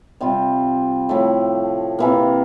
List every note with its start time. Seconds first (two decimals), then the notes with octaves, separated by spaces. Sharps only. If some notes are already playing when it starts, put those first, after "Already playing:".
0.21 C3 G3 C4 F4
1.09 A2 F3 A3
1.99 C3 E3 A#3